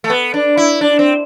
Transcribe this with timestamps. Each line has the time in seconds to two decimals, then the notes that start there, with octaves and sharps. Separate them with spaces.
0.04 A3
0.10 B3
0.34 D4
0.57 E4
0.81 D4
0.99 C4